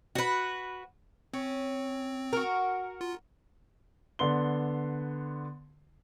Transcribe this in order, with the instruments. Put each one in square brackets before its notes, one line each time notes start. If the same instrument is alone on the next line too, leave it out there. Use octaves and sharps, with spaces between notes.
[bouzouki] F#4 B4
[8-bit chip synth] C4 [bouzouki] C#4
[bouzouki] F#4 A#4
[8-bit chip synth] F4
[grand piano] D3 B3 C6 G7